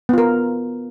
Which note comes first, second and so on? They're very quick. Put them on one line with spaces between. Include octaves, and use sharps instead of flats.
B3 F4 A#4